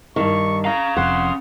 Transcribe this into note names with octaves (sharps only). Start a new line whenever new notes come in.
G2 D#3 C#6
C#4 F5 A#5
F1 F2 F#5 C6